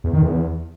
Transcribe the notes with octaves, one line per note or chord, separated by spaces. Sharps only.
E2
D#3
E2